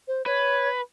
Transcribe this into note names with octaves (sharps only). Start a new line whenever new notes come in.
C5
B4 C#5